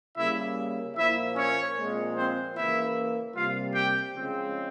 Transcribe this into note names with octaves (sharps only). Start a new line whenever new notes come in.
C#3 G3 A#3 E4 E5
A#2 F3 A#3 E4 E5
C#4 C#5
A#2 F3 G#3 C4
C4 C5
C#3 E3 A#3 E4 E5
C3 G3 A#3 F4 F5
G4 G5
C#3 F3 G#3 C4